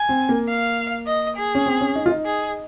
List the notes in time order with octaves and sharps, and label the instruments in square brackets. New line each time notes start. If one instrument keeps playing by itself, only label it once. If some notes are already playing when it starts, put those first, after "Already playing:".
Already playing: [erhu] G#5
[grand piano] C4
A#3
[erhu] F5
D#5
G#4
[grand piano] C#4
C4
C#4
D#4
F4
D#4
[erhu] G#4